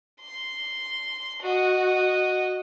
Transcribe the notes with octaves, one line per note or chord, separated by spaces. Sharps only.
C6
F#4 D#5